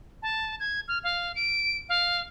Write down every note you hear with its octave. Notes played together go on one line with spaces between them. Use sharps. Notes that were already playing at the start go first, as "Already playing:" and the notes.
A5
G#6
F6
F5
D7
F5